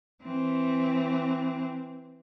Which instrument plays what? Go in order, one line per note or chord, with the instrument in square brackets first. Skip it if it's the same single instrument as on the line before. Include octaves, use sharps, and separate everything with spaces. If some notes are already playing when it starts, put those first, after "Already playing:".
[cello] E3 C4